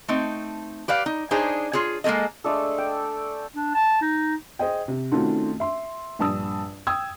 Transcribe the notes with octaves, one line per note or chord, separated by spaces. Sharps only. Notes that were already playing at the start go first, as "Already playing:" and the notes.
A3 C4 D#4
G4 B4 D5 F5
D#4
D4 D#4 G#4 C5 C#5
F4 G#4 C#5
G#3 A#3 C#4 A4 D#5
G#3 A3 D4 A4
G5
D4
A5
D#4
G#4 C5 D#5 G5
C3
D#3 A3 C4 C#4 F4 F#4
E5 C6
A#1 G2 A5 D#6 E6
G5 D#6 E6 G#6